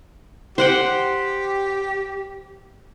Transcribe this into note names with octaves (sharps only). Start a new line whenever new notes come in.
G4 C5 F#5 G5